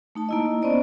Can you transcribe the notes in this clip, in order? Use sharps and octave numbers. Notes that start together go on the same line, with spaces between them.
A3 D#4 A5
A#3 E4 D#5
B3 C#4 C5 D5 D#5